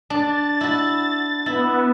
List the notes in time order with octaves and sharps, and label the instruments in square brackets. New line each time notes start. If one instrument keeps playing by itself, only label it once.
[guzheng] D4 [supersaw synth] A6
[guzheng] E4 F#4
[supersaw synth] B3 [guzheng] E4